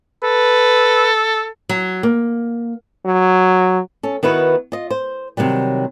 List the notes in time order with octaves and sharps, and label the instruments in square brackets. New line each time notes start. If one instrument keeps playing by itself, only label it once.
[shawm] A4 [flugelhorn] B4
[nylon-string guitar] F#3
A#3
[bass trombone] F#3
[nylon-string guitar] C#4 A4
D#3 B3 E4 F#4 B4
F4 D#5
C5
C3 D#3 F#3 G3